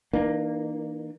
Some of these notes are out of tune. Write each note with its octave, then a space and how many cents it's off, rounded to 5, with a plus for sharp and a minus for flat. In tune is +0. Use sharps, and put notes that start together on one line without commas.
E3 -30 A#3 +0 D4 +45